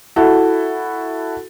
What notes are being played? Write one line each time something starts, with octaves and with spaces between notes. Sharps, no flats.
E4 F#4 A4